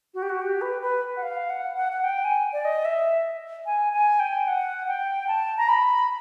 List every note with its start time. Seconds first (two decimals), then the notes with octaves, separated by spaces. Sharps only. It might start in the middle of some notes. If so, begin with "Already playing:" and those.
0.14 F#4
0.22 G4
0.29 F#4
0.41 G4
0.61 B4
0.82 B4
1.17 F#5
1.22 F5
1.50 F#5
1.77 F#5
1.92 F#5
2.04 G5
2.24 G#5
2.53 D5
2.65 D#5
2.85 E5
3.66 G#5
3.93 G#5
4.20 G5
4.47 F#5
4.88 G5
5.28 A5
5.57 A#5
5.69 B5